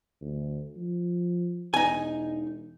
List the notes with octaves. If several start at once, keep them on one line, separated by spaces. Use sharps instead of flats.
D2
F3
E1 D#4 G#5